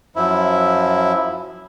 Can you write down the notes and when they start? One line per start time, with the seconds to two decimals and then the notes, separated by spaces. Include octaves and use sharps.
0.16 F#2 F3 E4